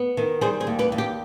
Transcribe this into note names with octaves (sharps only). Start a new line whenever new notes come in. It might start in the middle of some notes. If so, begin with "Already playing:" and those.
Already playing: B3
D#3
G3 G#4 C5
G#4 C5
D#2
G4 B4
D#2
G4